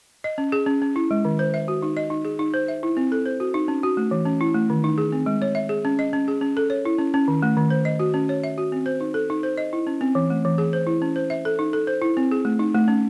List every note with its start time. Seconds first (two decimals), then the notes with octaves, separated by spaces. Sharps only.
0.24 D#5
0.38 C#4
0.52 G#4
0.66 C#4
0.82 C#4
0.96 E4
1.11 G#3
1.25 D#3
1.39 C5
1.54 E5
1.68 F#4
1.82 D#4
1.97 D#5
2.10 D#4
2.25 G#4
2.39 D#4
2.54 C5
2.68 E5
2.83 E4
2.97 C4
3.12 A4
3.26 C5
3.40 F#4
3.54 D#4
3.68 C#4
3.83 F#4
3.97 A3
4.11 E3
4.26 C#4
4.41 E4
4.54 A3
4.70 D#3
4.84 D#4
4.98 G#4
5.12 C4
5.26 G#3
5.42 C#5
5.55 E5
5.69 G#4
5.85 C#4
5.99 D#5
6.13 C#4
6.28 G#4
6.41 C#4
6.57 A4
6.70 C#5
6.85 E4
6.99 C#4
7.14 C#4
7.28 D#3
7.43 A3
7.57 D#3
7.70 C5
7.85 D#5
8.00 F#4
8.14 C#4
8.29 C#5
8.43 E5
8.58 F#4
8.72 C4
8.86 C5
9.01 D#4
9.14 A4
9.30 D#4
9.43 C5
9.58 D#5
9.73 E4
9.87 C#4
10.01 C4
10.15 E3
10.30 A3
10.45 E3
10.58 G#4
10.73 C5
10.87 E4
11.02 C#4
11.16 C5
11.30 E5
11.45 A4
11.59 D#4
11.73 A4
11.87 C5
12.02 E4
12.17 C4
12.31 G#4
12.45 A3
12.59 D#4
12.75 A3
12.88 C#4